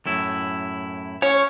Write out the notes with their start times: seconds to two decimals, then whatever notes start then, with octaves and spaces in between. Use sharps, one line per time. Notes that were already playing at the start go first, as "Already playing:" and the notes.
0.06 F#2 A2 E4
1.22 C#4 C#5